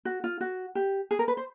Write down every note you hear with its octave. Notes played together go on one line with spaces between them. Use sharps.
F#4
F4
F#4
G4
G#4
A#4
B4
C5